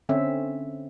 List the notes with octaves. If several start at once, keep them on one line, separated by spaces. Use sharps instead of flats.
D3 C4 C#4 E5